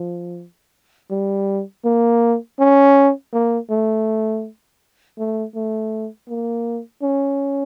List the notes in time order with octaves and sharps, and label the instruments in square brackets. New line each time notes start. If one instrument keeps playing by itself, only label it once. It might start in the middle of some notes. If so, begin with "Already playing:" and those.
Already playing: [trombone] F3
G3
A#3
C#4
A#3
A3
A3
A3
A#3
C#4